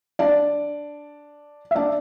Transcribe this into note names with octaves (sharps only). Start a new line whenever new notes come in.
D4 D5
E5
D4 D5